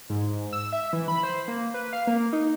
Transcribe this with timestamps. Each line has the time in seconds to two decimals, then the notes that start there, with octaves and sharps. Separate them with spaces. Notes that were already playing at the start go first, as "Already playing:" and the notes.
0.10 G#2
0.53 E6
0.72 E5
0.93 E3
1.08 B5
1.23 C5
1.48 A#3
1.74 B4
1.93 F5
2.07 A#3
2.33 D#4